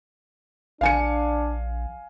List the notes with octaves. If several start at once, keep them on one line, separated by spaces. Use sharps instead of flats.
A#1 D4 F5 G#5 C#7